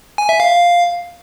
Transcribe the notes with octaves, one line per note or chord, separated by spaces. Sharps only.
G#5
E5
F5